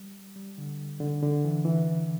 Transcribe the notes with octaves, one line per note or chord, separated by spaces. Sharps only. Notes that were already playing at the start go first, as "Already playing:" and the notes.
Already playing: G3
G3
D3
D3
D3
E3
E3